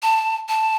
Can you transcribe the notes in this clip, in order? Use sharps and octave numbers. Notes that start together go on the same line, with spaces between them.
A5
A5